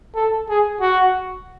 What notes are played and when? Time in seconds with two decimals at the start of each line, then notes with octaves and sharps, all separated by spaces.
0.16 A4
0.49 G#4
0.81 F#4